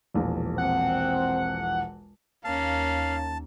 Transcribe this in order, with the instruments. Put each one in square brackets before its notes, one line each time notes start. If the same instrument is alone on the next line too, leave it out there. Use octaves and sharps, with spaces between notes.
[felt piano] E1 A#1 E2
[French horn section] C4 [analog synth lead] F#5
[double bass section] D#2 [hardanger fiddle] A#3 C#4 [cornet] F5 [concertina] A5